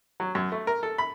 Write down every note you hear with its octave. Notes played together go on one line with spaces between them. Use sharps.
F#3
F#2
A3
A#4
A4
B5